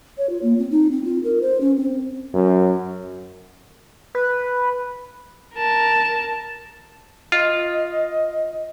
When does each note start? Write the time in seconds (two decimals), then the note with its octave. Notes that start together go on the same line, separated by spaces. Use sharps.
0.18 C#5
0.29 F4
0.43 A#3
0.58 C4
0.71 D#4
0.91 C4
1.05 F4
1.24 A#4
1.41 C5
1.61 C#4
1.76 C4
2.34 F#2
4.15 B4
5.56 A#4 A5
7.32 F4 D#5